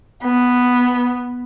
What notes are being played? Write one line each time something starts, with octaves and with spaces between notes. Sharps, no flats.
B3